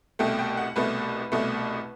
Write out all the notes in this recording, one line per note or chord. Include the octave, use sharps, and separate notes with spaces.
C2 B2 A3 G5
G5
F#5
C2 B2 A3 B4
C2 B2 A3